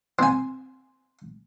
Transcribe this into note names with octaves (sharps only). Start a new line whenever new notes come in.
C4 G#5